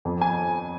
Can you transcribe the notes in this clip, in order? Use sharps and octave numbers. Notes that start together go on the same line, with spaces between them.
F2
G#5